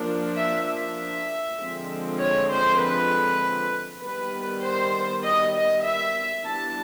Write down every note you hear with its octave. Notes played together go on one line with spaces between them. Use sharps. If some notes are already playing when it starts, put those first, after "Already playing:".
Already playing: F3 A#3 D4
E5
E5
D3 F3 G#3 C4
C#5
C5
B4
D#3 G3 B3 B4
C5
D#5
D#5
E5
E3 G3 B3 D4 A5